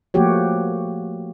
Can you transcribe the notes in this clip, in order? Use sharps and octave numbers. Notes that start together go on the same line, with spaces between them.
F3 A3 A#3 F#4 G4 C#5